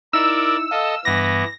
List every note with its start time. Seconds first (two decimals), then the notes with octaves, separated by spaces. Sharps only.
0.13 D#4 E4 A#4 D5 E6 C#7
0.71 A4 D#5 F5
1.05 G2 E3 B3 D6 A#6